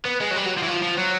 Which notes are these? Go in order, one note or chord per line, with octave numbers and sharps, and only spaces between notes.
B3
G#3
F#3
G3
F#3
F3
E3
F3
F3
F#3